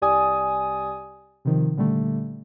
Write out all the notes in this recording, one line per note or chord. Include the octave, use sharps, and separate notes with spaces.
C2 G4 D5 G#5 D#6
C3 D#3 F3
A#2 D3 G3 A3